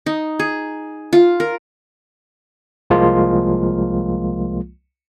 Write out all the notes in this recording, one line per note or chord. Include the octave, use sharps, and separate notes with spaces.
D#4
G#4
F4
A#4
C2 F3 G#3 A#3 F4